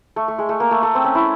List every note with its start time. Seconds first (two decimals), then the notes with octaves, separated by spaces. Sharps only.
0.16 A3
0.28 A3
0.39 G#3
0.49 A3
0.60 A#3
0.71 A3
0.83 A3
0.95 C4
1.04 C#4
1.15 E4